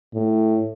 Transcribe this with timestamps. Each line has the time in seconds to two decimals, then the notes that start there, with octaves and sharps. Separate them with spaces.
0.14 A2